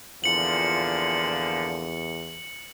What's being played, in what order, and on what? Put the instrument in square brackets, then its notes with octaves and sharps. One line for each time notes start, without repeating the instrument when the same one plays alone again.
[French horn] E2 [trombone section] A#2 D3 F3 [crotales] C#7 F#7